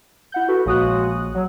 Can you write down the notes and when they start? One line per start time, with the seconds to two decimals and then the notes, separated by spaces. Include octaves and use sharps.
0.32 E4 F#5 G6
0.48 F#4 A4 B4
0.66 A#1 C#3 G#3 F#4 D#6 F#6
1.35 F#3